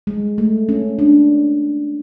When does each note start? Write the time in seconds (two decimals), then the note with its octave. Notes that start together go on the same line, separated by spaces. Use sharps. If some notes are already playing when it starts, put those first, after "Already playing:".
0.07 G#3
0.38 A3
0.69 C#4
0.99 D4